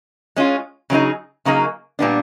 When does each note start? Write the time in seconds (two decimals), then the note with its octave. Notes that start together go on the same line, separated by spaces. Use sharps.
0.36 G#3 C#4 F4
0.90 C#3 F#3 A#3 D#4 G#4
1.45 C#3 F#3 A#3 D#4 G#4
1.99 A#2 G3 B3 D4